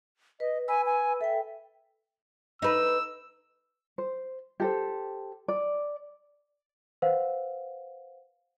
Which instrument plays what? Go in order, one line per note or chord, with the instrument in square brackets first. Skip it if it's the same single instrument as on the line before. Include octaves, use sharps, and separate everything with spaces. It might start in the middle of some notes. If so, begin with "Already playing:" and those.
[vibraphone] B4 [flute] D#5
[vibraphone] B4 B5 E6 [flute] G#5
[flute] G#5
[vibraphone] A4 G5 [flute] E5
[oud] D#4 B4 [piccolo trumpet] E6
[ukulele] C5
G4 A4 C5
D5
[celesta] B4 C5 F5 F#5